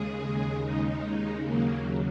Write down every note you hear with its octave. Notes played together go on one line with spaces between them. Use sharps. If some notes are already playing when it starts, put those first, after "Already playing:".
Already playing: D#2 C#3 G#3 G#4
D#4
D#2 C#3 F#3 A#3